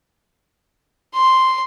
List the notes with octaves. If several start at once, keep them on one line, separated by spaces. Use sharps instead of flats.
C6